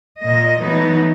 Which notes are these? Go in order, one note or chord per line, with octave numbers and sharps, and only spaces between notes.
A#2 D#5
E3 F#3 A3 B3 D#4